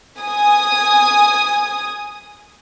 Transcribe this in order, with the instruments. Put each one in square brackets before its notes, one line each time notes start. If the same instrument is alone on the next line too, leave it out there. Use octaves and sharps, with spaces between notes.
[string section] G#5 D#6